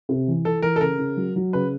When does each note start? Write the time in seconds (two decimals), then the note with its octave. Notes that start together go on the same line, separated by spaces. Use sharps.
0.09 C3
0.28 E3
0.45 E3 A4
0.62 E3 A#4
0.76 A4
0.81 C#3 A#4
0.99 C#3
1.17 F#3
1.36 F#3
1.53 C#3 B4